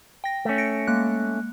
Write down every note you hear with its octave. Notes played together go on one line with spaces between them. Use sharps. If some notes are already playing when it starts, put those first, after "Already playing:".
G5 A#6
A3 C#4
A#6 C#7 D7
G#3 A#3 F#6